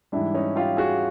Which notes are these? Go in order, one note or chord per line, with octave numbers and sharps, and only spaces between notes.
G#2 E3 G3 D4 E4
C#4 D#4
F4 G4
F#4 G#4